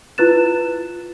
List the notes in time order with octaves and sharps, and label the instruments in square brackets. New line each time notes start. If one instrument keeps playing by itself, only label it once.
[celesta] E4 F4 B4 F#6 A6 E7